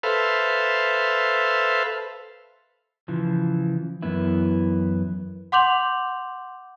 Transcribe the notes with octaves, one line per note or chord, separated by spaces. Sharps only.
A4 B4 C5 E5 F5
C#3 E3 F3
F#2 E3 B3 E4
F#5 C6 D6 G6 F7 F#7